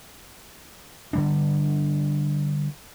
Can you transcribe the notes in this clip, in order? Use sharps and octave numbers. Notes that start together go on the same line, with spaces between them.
D3 G3 D4